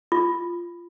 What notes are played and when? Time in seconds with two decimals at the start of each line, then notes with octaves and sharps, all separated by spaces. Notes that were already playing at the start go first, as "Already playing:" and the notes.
0.12 F4